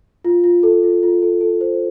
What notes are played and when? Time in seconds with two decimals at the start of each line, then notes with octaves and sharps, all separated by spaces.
0.25 F4
0.44 F4
0.63 A4
0.83 F4
1.03 F4
1.22 A4
1.41 A4
1.61 C5